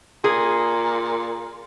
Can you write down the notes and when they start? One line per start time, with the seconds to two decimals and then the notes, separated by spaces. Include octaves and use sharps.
0.24 A#2 G#4